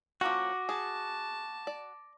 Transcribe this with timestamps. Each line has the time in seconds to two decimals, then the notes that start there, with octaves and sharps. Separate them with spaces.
0.21 F3 A#3 C#4 F#4 D6 A#6
0.69 G#4 A5
1.67 D5